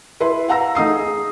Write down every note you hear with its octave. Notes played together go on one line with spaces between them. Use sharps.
E4 B4 E5 C6
F5 F#5 A#5 E6 A#6
A3 D#4 D#6 C7
G#4